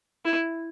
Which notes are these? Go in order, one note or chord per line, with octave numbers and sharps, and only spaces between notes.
E4